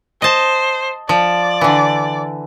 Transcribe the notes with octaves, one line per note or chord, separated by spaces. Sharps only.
C5 D#5 A5
F3 D5
D3 E3